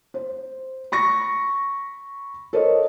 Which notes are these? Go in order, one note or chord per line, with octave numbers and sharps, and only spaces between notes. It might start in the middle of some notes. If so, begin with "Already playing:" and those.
C5
B5 C#6 A#6
A4 A#4 C5 C#5 D#5